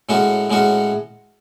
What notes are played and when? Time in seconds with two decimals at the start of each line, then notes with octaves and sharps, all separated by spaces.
0.09 A2 G#3 C#4 F#4
0.50 A2 G#3 C#4 F#4